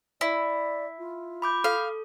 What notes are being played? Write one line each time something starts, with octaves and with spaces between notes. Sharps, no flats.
E4 D5
F4
B5 D6 G6
A4 F5